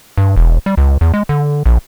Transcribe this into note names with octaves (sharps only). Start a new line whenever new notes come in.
G2
E1
G3
C#2
E2
G#3
D3
A#1